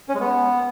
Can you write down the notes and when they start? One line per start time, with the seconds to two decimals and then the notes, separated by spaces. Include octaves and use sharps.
0.09 C#4
0.15 G#3
0.20 B3